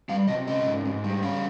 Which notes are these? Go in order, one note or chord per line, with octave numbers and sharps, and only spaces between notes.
G3 F5
C3 D#5
C#4 D#5
G#2
G#2
G3
C#4 F5